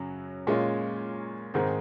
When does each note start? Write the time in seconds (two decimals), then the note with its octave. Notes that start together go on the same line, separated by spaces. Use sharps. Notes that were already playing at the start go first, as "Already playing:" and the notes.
Already playing: F#2 C#3 F#3
0.47 A#2 G#3 C#4 F4
1.54 G#2 D#3 G#3 C4 D#4